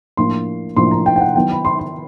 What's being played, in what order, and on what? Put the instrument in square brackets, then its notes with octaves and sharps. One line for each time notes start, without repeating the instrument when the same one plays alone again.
[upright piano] A2 F3 A#3 D4 C6
A2 F3 A#3 D4 C6
A#5
G5
G5
F#5
D#3 F#3 B3 E4 G5
B5
C6
C6